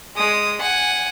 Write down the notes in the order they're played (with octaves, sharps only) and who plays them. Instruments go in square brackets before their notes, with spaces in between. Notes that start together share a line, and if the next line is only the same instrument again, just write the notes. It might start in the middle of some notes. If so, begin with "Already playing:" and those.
[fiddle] G#3 D#6
F#5 G#5